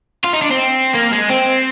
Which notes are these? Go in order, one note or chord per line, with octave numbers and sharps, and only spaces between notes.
F4
D#4
D4
C4
A#3
G#3
C4